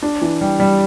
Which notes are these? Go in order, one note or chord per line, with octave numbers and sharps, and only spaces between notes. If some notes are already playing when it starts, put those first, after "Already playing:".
D4
E3
G3
G3